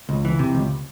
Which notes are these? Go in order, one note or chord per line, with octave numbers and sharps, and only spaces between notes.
C#2
E3
C3
C#2